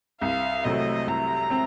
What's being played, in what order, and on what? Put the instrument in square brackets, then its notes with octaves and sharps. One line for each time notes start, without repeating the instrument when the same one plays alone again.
[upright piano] C2 [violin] F5
[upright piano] C3 F#3 A3 C4 [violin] D#5
[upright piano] C2 [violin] A#5
[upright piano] C4